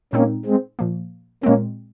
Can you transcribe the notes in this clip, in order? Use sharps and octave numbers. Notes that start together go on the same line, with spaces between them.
A#2 G#3 A#3 C4 C#4 D#4
G#3 C4
A#2 F3 A#3
A#2 G#3 A#3 C4 C#4